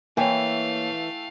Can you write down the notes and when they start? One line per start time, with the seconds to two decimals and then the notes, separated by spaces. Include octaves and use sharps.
0.17 E3 A3 A#3 C#5 F5 G5 G#5